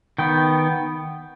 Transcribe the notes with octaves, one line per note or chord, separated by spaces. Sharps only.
D#3 B3 G5